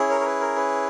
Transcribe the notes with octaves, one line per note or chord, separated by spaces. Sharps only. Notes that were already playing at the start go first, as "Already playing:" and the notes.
Already playing: C#4 E4 G#4
A#4 C#5
A#4
B4
A#4
B4